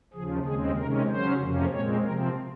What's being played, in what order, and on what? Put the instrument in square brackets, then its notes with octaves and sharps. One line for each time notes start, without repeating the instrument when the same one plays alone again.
[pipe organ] D#2 C#3 F3 G#4
D#2 C#3 G#3 C4 G#4
C3 D#3 G#3 C#4 A#4
C#3 F#3 C#4 C5
F2 C3 F3 A#3 C#4
A#2 G#3 C4 C#5
C3 F3 C4 A#4